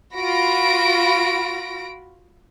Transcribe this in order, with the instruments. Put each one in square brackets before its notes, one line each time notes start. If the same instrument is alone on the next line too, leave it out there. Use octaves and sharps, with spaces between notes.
[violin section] F4 F#4 B5 A#6 D7